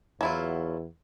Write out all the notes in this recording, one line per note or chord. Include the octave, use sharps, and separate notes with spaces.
E2 F#3 E4 F4